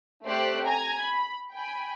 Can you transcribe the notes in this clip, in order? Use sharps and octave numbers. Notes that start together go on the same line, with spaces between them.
A3 C4 G4 C5 D5 F#6
G#5 A#5 G#6
B5
G5 G#5 B5